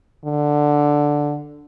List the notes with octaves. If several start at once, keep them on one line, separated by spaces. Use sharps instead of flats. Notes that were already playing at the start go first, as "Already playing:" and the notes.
D3